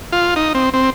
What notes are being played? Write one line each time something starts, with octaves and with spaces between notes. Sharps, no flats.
F4
D#4
C4
C4